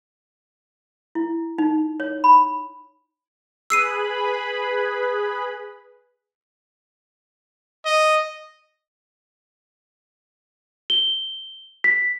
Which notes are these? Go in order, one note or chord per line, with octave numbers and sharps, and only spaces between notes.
E4
D#4
C#5
B5
G#4 B4 B5 E6 C7 D#7
D#5
G7
B6